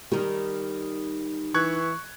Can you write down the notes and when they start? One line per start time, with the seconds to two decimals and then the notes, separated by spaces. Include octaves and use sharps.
0.12 D#3 G3 D#4
1.54 E3 C#6 F#6 G#6